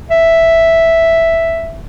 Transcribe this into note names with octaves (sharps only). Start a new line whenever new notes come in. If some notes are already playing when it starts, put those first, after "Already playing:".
E5